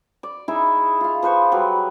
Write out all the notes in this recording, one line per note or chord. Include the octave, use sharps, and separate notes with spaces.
D5
D#4 E4 G#4 E5
F4 F5
F3 B4 C5 C#6
F#3 G3 B4